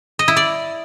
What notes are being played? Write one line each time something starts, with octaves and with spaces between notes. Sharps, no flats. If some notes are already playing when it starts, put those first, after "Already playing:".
D#5
E4
D5